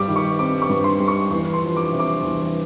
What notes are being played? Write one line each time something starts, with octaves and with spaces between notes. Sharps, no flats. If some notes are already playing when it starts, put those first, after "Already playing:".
Already playing: G2 G3 D6
D#3
C#6
C4 D6
C#6
G2
C6
G3
C#6
E2 C#6
C6
F3
D6
C3
D6
E2